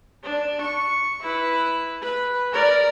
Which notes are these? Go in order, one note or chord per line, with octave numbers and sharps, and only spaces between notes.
D4
C#6
E4 B4
B4
A#4 D5